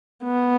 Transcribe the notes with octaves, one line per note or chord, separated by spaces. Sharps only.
B3